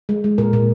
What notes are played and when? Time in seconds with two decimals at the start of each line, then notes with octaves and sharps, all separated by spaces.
0.09 G#3
0.24 G#3
0.38 A#2 A#4
0.53 A#2